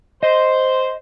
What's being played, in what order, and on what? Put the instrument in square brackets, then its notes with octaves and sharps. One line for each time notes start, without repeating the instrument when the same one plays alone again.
[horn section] C5 [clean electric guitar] D#5